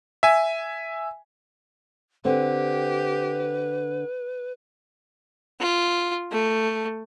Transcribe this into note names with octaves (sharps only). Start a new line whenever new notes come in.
E5 G#5
D3 C4 G4 B4
F4
A3